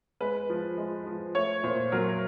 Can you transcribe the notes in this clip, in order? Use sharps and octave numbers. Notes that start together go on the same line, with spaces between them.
G#3 B4
F3
G#3
F3
A3 C#5
A#2 C5
F#3 A#4